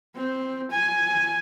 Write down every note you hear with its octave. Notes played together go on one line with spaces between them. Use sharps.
C4
G#5